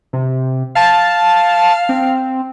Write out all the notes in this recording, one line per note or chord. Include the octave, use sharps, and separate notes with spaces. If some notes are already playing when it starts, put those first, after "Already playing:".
C3
F5 A5
C4